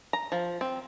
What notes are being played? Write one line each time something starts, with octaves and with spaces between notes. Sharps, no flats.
A#5
F3
C4